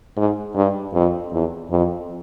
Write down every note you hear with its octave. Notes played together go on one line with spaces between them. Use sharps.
G#2
G2
F2
E2
F2